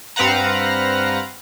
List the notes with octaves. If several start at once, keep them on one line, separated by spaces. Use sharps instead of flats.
G2 C4 B4 F5 F#5 A#5